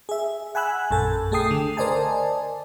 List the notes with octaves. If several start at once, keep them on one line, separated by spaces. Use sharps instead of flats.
G#4 E5
F#5 G#5 B5 E6 F#6
A#1 F#2 A4 G#5
A3 G#4 A4 G5 D#6 C7
D3
A#4 C5 D5 D#5 G#5 A5